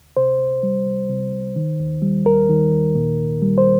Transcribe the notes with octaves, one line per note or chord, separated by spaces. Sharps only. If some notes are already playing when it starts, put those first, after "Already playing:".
Already playing: D2
C3 C5
C2
G3
C2
C3
C2
D#3
D#2
G3
D#2 A#4
D#3
D#2
A#2
C2
G3
C5